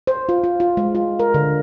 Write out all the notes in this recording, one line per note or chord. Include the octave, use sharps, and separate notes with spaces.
C5
F4
F4
F4
G#3
F4
A#4
D3